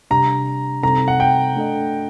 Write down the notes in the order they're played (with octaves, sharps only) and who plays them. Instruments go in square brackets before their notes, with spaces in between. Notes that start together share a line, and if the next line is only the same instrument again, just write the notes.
[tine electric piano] C3 G3 D4 G4 [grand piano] A#5
[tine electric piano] C3 G3 C4 D#4 A4 [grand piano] A#5
[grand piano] F#5
G5
[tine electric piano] A3 D4 A4 D#5